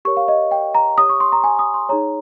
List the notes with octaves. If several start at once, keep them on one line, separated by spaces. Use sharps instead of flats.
G4 A#4 C#5 C#6
F5
D#5
G5
A#5
G4 C#5 D#6
C#6
C6
A#5
G#5
D#6
C6
D#4 G#4 C#5 A#5